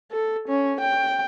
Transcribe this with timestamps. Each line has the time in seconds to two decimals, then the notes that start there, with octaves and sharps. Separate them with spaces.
0.11 A4
0.48 C#4
0.81 G5